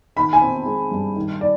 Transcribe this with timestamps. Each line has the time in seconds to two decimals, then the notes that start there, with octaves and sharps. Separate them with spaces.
0.16 D#3 B5
0.33 G#5
0.42 C4
0.66 G#3
0.91 G2
1.16 D#3
1.41 D5